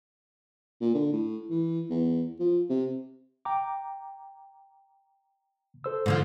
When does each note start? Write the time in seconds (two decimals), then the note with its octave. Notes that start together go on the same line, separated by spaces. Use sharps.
0.81 A#2
0.95 D3
1.13 A2
1.50 E3
1.90 E2
2.40 F3
2.69 C3
3.45 G5 A#5 D6
5.84 A4 C5 E6
6.06 G#2 D3 F3